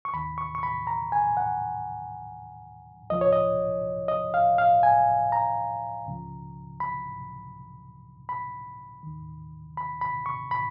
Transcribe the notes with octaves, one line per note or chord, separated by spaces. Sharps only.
C#6
D#2 D#3 B5
C#6
C#6
B5
A#5
G#5
F#5
C#2 C#3 F3 D#5
C#5
D#5
D#5
F5
F5
G#5
A#5
C#2 C#3 F3
B5
B5
D#2 D#3
B5
B5
C#6
B5